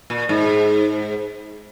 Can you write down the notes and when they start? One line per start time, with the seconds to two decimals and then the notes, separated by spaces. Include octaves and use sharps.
0.10 A#2
0.29 G#2